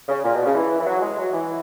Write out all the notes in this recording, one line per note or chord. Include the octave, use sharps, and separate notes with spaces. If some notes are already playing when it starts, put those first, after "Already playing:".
C#3
A#2
B2
C#3
E3
E3
F#3
G#3
F#3
E3